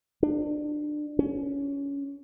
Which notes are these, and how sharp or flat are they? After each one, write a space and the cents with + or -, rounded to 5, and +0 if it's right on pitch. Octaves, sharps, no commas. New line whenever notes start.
D4 +25
C#4 +20